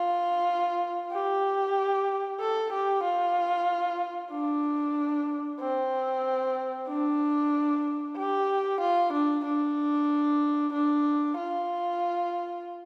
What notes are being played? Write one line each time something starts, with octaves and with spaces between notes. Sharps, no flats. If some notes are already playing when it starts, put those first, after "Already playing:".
Already playing: F4
G4
A4
G4
F4
D4
C4
D4
G4
F4
D4
D4
D4
F4